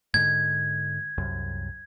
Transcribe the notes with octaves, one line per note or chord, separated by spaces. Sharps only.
G#2 D3 G#6
C2 F#2